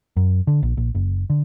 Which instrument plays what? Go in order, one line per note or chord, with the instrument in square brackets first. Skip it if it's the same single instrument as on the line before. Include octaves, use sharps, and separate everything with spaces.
[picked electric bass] F#2
D3
A#1
A#1
F#1
D3